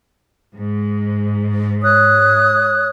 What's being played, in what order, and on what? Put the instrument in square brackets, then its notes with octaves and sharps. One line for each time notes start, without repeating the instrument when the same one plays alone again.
[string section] G#2
[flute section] C#5 D#6 F#6